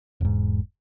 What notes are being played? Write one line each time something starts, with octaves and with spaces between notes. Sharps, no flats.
E1 G#2